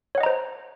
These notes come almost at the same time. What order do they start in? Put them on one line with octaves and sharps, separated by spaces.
C#5 F#5 D#5 A#5 C5